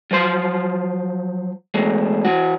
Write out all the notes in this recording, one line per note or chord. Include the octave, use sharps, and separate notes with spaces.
F3 F#3 C5 C6
E3 G#3 A3
E3 F#4